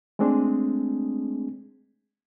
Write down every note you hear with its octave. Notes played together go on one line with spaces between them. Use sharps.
G#3 A3 C4 D4 G#4